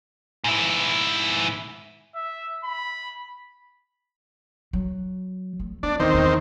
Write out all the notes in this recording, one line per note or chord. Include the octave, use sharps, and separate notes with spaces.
G#2 E4
E5
B5
F#3
A3
B3 D4
E2 D#3 C4
E2